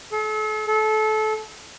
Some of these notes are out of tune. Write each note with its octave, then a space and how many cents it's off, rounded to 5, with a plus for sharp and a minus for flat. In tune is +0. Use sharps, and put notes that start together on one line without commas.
A4 -40
A4 -25